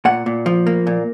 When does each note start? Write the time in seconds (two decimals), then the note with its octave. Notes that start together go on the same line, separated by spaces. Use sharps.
0.05 A#2 F#5
0.26 A#2
0.46 F3
0.67 A#3
0.87 A#2